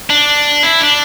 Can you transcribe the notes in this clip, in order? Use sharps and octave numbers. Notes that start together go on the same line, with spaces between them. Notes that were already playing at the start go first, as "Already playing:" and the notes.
D4
E4
D4